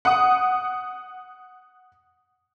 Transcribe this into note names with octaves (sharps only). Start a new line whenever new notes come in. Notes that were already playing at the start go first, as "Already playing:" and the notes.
F#5 D#6